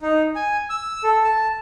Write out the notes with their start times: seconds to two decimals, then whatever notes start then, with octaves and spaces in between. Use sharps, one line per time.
0.01 D#4
0.36 G#5
0.70 E6
1.03 A4
1.24 A5